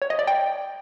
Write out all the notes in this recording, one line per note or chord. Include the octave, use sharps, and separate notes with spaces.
C#5
D#5
D5
G5